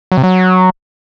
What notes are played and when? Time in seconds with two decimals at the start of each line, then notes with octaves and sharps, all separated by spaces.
0.12 F#3
0.17 C3
0.23 F#3